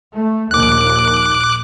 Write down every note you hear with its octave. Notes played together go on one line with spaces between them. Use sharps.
A3
A#1 D#2 D6 F#6